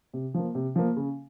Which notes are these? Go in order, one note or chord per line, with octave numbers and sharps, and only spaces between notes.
C3
F3 A#3
C3
F3 A#3
C#3